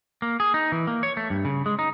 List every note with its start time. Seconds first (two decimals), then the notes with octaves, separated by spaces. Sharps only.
0.22 A#3
0.40 G#4
0.54 D#4
0.72 E3
0.87 A#3
1.03 C#5
1.17 A3
1.30 G2
1.45 C#3
1.66 G#3
1.79 D#4